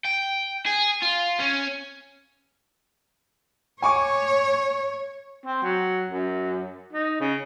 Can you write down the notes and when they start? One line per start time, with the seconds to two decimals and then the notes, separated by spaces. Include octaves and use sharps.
0.05 G5
0.66 G#4
1.02 F4
1.40 C#4
3.82 C#5 G#5 C#6 D6
5.46 C4
5.63 F#3
6.10 F#2
6.93 D#4
7.20 C#3